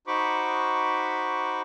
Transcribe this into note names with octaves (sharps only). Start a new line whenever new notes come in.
D#4 F#4 C5 B5 C#6 D6